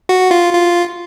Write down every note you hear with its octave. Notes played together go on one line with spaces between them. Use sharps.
F#4
F4
F4